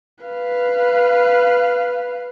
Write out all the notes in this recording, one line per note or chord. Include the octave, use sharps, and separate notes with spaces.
B4 F5